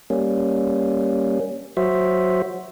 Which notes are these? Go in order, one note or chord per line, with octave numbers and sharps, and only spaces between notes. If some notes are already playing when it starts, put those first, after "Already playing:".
G3 A#3 C#4
F#3 F#4 C5 E5